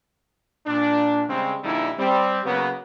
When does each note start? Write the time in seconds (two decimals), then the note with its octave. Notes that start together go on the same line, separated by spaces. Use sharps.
0.66 A#2 D4
1.29 C#3 G3 G#3 C4
1.64 A#1 A#2 D3 G3 D#4 E4
1.98 G3 C4
2.45 C#3 F#3 A#3 B3